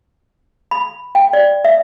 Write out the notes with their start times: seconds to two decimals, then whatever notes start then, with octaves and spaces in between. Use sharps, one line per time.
0.71 B5
1.15 G5
1.33 D5
1.65 E5